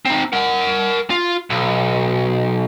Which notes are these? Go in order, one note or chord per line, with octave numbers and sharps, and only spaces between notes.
C4 D#4
A#4 F#5
F4
B1